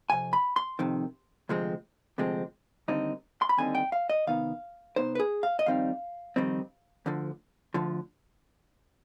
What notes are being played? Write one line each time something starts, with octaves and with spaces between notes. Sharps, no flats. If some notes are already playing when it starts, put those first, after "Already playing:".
F2 C3 G#5
B5
C6
F2 C3 D#3
D2 C3 F3 G#3 C4
D2 C3 F3 G#3 C4
D#2 D3 G3 C4 D#4
C6
B5
D#2 D3 G3 C4 D#4 G#5
G5
F5
D#5
C3 D#3 B3 D#4 F5
C3 D#3 B3 D#4 C5
B4
G#4
F5
D#5
F2 D#3 G3 C4 D#4 F5
F2 D#3 G3 C4 D#4
D2 D3 F3
D2 D3 F3